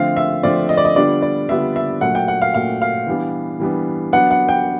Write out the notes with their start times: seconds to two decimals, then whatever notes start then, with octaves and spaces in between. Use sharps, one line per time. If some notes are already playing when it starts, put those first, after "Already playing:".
Already playing: D3 F3 A3 C4 F4 F5
0.17 E5
0.43 D3 F3 A3 C4 F4 D5
0.69 D#5
0.77 D5
0.85 D#5
0.96 D3 G3 B3 D4 F4 D5
1.22 D5
1.49 D3 G3 B3 D4 F4 E5
1.76 E5
2.01 A#2 F#3 A3 F#5
2.15 G5
2.28 F#5
2.42 F5
2.54 A#2 F#3 A3 F5
2.82 F5
3.07 E3 G3 B3 D4
3.60 E3 G3 B3 D4
4.13 F#3 B3 D4 F#5
4.31 F#5
4.49 G5